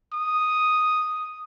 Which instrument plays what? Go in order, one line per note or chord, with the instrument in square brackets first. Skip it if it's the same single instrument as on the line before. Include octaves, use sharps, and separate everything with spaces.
[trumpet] D#6